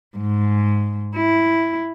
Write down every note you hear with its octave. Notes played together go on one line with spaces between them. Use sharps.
G#2
E4